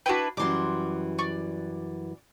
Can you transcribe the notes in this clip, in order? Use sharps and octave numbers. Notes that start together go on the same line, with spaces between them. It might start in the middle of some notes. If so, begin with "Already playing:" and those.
D4 E4 F#4 B4 G5
F#2 E3 G3 C6 D6
D5 C#6